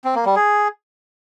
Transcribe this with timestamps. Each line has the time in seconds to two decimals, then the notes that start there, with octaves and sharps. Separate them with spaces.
0.04 C4
0.15 A#3
0.26 G3
0.36 G#4